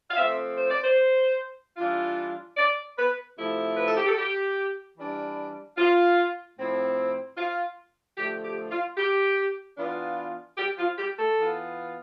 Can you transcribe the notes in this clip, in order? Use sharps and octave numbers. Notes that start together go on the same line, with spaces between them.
F5
F3 A3 C4 E5
C5
D5
C5
E3 G3 D4 F4
D5
B4
C3 F3 A3 E4
B4
A4
G4
A4
G4
E3 G3 D4
F4
A2 F3 C4 E4
F4
D3 F3 A3 G4
G4
F4
G4
E3 B3 D4 F4
G4
F4
G4
A4
E3 B3 F4